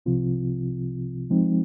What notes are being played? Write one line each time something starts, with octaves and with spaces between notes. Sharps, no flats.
C2 C3 F3 C4 F4
F3 G#3 C4 D#4